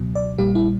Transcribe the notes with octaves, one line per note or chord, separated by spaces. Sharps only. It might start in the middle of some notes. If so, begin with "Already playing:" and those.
Already playing: C#2 B2 F#3
D5
A#1 A#2 G3 G4
E4